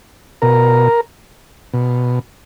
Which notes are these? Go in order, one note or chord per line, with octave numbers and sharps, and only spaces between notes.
B2 A#4
B2